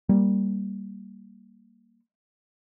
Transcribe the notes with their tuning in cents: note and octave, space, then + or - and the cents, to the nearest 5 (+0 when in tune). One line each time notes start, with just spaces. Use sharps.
G3 +0 A#3 +0